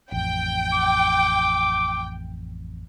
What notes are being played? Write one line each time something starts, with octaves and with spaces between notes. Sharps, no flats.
A1 F2 G5
D6